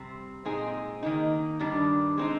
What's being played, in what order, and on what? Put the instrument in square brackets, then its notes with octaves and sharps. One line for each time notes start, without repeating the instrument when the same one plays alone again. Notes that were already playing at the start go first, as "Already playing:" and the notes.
Already playing: [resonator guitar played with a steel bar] C3 G3 C4
A#2 G#3 C4 D#4 G#4
D#3 A#3 D#4
G2 D#3 G3 D4
G#3 C4 D#4